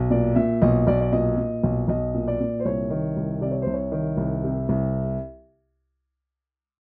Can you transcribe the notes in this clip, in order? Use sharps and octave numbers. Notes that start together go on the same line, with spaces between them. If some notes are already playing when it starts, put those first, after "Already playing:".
Already playing: B1
A#2 D5
A#2 E5
B1 D#5
B1 D5
D5
A#2 D#5
A#2
B1
B1 D#5
A#2
D5
A#2
C5
C2 C#5
D#3
C2
C3 D5
C#5
C2 C5
C#5
D#3
C2
C3
C2